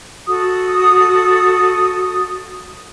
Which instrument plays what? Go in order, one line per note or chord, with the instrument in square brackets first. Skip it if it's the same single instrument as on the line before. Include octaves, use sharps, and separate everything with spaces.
[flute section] F#4 A4 D#6